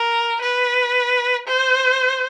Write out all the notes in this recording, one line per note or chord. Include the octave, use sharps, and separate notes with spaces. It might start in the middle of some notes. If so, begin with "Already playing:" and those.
Already playing: A#4
B4
C5